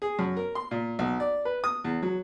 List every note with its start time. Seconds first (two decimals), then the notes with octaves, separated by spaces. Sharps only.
0.02 G#4
0.19 F#2
0.37 A#4
0.55 C6
0.71 A#2
0.99 B1
1.20 D5
1.45 B4
1.64 D#6
1.84 E2
2.03 F#3